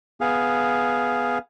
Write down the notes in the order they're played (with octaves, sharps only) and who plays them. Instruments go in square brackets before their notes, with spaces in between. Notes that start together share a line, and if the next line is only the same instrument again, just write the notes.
[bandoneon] B3 G#4 F5